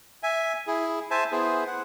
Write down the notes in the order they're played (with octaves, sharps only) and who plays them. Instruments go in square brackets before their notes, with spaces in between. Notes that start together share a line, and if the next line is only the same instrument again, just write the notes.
[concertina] E5 G#5
E4 G#4
C5 E5 G#5 A5
B3 E4 G#4 C5
F#5